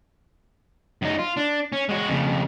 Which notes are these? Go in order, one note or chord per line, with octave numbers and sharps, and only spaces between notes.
F#2 D#4
F4
D4
C#4
G#3 F#4
F2 C#3